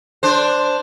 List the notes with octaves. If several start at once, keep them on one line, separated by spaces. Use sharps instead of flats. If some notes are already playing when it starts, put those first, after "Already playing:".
D4 C5